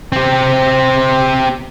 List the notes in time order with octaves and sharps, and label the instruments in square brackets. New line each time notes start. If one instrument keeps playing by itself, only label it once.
[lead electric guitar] C4 G4